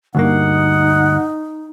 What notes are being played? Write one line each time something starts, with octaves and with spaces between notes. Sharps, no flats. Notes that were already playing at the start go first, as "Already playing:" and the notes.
D2 G2 A#3 D#4 F#5